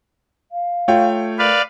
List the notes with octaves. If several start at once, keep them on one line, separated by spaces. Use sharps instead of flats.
F5
A3 F4 C#5 G5
A#4 B4 D5 F5